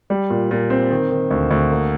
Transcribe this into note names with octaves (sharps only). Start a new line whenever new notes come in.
G3
A#2
A#2
C4
D#3
D#3
D2
D2
A#3